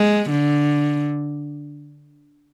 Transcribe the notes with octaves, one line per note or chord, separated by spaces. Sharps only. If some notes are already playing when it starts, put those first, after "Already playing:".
Already playing: G#3
D3